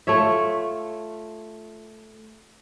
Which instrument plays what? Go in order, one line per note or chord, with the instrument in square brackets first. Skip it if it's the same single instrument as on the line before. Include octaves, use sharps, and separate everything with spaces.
[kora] A3 F4 C#5 E5